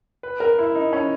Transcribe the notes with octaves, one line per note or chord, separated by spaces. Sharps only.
B4
A#4
E4
D#4
C#4